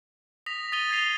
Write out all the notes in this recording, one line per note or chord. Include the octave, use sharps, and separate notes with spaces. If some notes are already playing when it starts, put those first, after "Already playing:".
D#6 A#6 B6 F7
D#6 A6 A#6 D#7 G7
G#6 A6 C7 F7